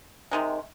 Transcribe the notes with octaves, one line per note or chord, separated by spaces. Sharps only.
C3 D#3 G#3